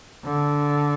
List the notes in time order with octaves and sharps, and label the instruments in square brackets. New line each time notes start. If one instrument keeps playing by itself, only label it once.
[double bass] D3